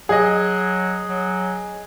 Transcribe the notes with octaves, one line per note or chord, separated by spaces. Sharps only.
F#3 G#4 D#5
F#3